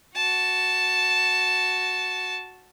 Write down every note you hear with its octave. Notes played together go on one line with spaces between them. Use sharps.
F#4 A5